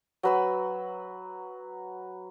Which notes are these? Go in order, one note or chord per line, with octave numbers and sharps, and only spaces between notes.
F#3 B4 E6